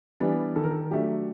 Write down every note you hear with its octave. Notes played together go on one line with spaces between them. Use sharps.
E3 G3 B3 D4
D#3 A4
A#4
A4
F#3 A3 D4 G4